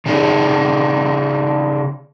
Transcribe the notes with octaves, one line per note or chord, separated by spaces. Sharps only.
C#3 D4 D#4 G#4 A4